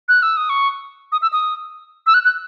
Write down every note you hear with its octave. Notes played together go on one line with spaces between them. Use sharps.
F#6
E6
D#6
C#6
D#6
E6
D#6
E6
F#6
F#6